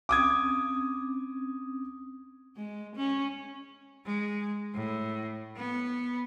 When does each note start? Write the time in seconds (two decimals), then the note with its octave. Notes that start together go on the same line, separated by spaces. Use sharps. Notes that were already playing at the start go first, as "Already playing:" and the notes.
0.09 C4 C#4 D6 D#6 G#6
2.56 G#3
2.95 C#4
4.05 G#3
4.75 A2
5.56 B3